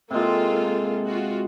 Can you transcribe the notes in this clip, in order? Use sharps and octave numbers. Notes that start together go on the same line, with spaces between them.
C3 G#3 A#3 F4 A4
F4 F#4